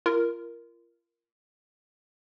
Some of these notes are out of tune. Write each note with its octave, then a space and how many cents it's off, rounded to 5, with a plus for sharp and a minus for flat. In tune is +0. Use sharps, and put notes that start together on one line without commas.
F4 -35 A#4 +0